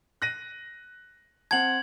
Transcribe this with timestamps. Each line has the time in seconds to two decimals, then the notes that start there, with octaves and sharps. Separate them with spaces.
0.22 F#6 A#6 D#7
1.51 C4 F#5 A5 G#6 F#7